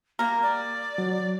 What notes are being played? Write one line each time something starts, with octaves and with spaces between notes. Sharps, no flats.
G3 A#3 A#4
D5
F#3